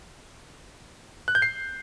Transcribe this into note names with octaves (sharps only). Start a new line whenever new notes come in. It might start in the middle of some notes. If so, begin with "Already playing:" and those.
F#6
G6
C7